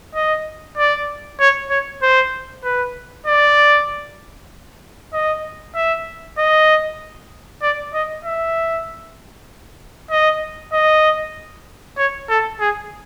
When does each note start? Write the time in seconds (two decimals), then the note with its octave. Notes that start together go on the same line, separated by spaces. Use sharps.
0.15 D#5
0.78 D5
1.40 C#5
1.70 C#5
2.02 C5
2.64 B4
3.26 D5
5.13 D#5
5.75 E5
6.38 D#5
7.62 D5
7.93 D#5
8.24 E5
10.11 D#5
10.73 D#5
11.97 C#5
12.29 A4
12.60 G#4